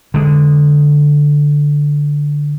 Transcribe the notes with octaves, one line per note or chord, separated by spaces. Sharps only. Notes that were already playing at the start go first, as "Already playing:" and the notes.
D3 G#3